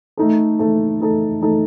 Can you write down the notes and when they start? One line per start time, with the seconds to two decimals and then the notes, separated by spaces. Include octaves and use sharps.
0.17 A3 D#4 A4
0.59 A3 D#4 A4
1.00 A3 D#4 A4
1.41 A3 D#4 A4